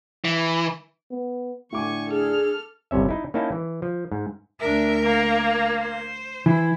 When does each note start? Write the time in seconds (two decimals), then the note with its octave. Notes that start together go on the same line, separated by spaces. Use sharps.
0.25 E3
1.11 B3
1.72 A2 D3 G#5 C#6 D6
2.10 D4 G#4 A4 F6
2.91 G1 C2 C3 C#4 E5
3.09 D#4 E4
3.34 A#3 C#4 D#4 E4 G5 A5
3.52 E3
3.82 F3
4.12 G#2
4.60 D2 D4 A#4 E5
5.04 A#3
5.78 C5
6.46 E3 E4